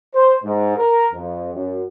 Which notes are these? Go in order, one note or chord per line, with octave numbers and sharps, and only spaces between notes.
C5
G#2
A#4
F2
F#2